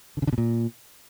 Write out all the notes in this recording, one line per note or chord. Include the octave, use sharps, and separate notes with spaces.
D3
C#3
D3
B2
A#2